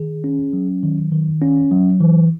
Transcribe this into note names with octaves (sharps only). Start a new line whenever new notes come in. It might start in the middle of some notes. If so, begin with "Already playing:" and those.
Already playing: D#3 G#4
C#4
F#3
D#3
D#3
C#4
F#3
E3